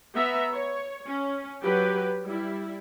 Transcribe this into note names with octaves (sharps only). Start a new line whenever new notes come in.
B3 E5 A#5
C#5
C#4
F#3 G4 B4
G3 E4